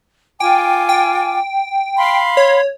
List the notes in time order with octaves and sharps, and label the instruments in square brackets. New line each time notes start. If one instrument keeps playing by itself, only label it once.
[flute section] F4 G#5 D6 [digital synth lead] G5
[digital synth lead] G5
[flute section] F5 B5 C6
[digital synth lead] C#5